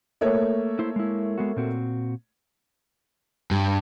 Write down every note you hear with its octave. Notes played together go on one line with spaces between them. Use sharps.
A3 A#3 C#5
E4 C5
G#3 E4
G#3 B3 F#4
A#2 C4 F#4
G2